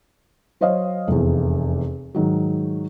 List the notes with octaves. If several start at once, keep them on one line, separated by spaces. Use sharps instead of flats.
F#3 C5 C#5 D#5 F5
F1 E2
G#2 D#3 F#3